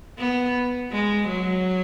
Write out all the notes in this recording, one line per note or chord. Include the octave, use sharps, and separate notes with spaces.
B3
G#3
F#3